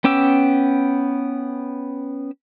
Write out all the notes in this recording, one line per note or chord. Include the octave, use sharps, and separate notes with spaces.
B3 C#4 G5 D6 E6